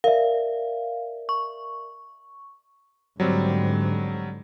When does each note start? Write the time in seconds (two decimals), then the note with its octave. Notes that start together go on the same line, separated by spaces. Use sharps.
0.04 A#4 D5 E5 F5
1.29 C#6
3.20 G#2 D3 F#3 G3 C4